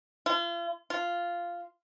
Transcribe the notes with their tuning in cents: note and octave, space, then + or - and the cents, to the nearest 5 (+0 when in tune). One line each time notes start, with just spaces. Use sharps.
F4 -40
F4 -5